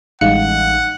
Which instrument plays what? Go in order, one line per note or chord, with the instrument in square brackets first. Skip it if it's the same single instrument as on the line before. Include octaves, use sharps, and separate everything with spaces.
[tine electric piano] A1 F#6 C#7 [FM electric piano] G3 G#3 D#4 [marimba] F5 [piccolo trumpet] F#5